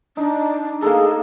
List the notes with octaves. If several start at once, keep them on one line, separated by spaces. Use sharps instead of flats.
D4 D#4
A#3 D#4 G#4 A4